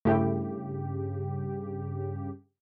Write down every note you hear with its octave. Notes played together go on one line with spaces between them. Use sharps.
G2 C#3 A3 E4 G4 G5